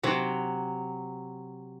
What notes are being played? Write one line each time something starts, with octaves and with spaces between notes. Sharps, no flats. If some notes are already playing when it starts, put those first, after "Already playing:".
C3 F#3